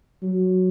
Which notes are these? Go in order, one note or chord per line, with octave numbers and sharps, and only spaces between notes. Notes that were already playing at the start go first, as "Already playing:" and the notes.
F#3